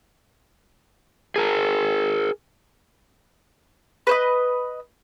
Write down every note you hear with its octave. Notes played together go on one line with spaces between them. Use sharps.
G#4 A#4
B4 C5 D#5